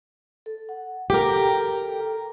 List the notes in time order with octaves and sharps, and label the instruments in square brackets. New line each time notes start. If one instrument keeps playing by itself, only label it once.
[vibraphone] A4
F#5
[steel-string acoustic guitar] G4 A#4 [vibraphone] A4 G5
[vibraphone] A4